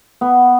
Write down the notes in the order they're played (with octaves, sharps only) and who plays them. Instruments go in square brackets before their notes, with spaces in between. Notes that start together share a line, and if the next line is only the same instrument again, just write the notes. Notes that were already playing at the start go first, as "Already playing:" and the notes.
[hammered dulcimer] B3